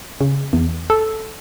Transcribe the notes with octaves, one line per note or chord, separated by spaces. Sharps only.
C#3
E2
A4